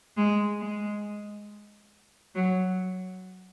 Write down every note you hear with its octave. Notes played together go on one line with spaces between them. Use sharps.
G#3
G#3
F#3